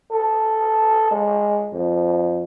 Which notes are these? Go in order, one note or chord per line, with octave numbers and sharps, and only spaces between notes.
A4
G#3
F2